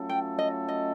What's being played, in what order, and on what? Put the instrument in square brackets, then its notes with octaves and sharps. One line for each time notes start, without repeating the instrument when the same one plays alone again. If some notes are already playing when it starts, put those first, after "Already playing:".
Already playing: [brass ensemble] F#3 A3 C#4 F4 A4
[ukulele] G5
D#5
D#5